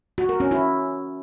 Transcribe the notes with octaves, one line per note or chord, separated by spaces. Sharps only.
F#4
A#4
C#4
E4